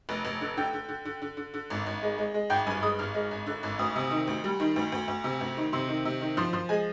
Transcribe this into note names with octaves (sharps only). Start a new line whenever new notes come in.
F1
F1
D3
D3 G5
D3
D3
D3
D3
D3
D3
G#1
G#1
G#3
G#3
G#3
G#1 G5
G2 G#5
G#3 D#6
G#1 F6
G#3
G#1
D3
G#1
D2 D#6
C3
D#3
D2
G3
D#3
D2
D2
D2
C3
D2
D#3
C3 C6
D#3
C3
D#3
F3 C6
F3 C6
G#3 G#5